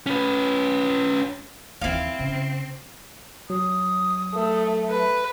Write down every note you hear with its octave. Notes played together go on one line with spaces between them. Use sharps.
C#4 B4
D#2 E3 C4 E4 F5
C#3
F#3 D#6
A3
B4